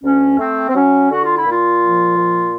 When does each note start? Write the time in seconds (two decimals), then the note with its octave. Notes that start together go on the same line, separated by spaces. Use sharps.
0.04 D2 C#4
0.39 A3 C4
0.69 C4
0.75 F#3 C#4
1.10 D3 F#4
1.23 F4
1.36 E4
1.46 A#2 F4
1.82 F3
2.17 A#2